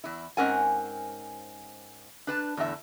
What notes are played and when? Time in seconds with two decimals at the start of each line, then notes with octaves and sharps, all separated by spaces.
0.04 E2 E4
0.37 G#2 C4 C#4 A#4 F#5 G#5
2.27 D4 B4 A5
2.57 E2 A2 D3 F4 E5